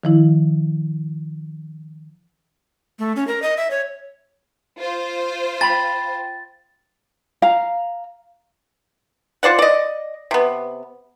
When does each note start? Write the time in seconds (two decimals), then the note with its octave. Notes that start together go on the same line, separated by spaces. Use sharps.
0.04 D#3 F3 E4
2.99 A3
3.16 C#4
3.27 A#4
3.42 D#5
3.57 E5
3.71 C#5
4.78 F4 C5
5.61 G5 B5 A6
7.42 F5 A#5
9.43 F4 C5 D5 F#5
9.59 D5 D#5
10.31 C3 B3